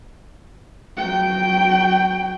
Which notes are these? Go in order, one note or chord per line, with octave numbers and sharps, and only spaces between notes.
F#3 G5